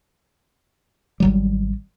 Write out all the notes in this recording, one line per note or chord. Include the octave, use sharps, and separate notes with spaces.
G#1 F#3 G3